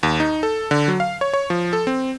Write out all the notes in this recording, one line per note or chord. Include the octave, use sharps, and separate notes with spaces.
D#2
D#4
A4
D3
F#3
F5
C#5
C#5
F3
A4
C4